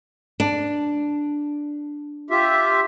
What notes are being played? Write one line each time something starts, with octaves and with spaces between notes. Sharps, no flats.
D4
F4 G4 E5